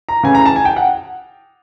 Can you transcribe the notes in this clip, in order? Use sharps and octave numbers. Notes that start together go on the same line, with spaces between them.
A#5
C#3 E3 A3 G#5
A#5
A5
G#5
G5
F#5